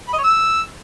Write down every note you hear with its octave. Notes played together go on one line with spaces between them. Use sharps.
B5
D#5
C#5
E6